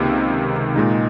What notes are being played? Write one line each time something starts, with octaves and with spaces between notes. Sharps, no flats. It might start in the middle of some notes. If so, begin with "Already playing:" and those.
Already playing: C#2 C3 D#3 A#3
A#2 G#3 D#4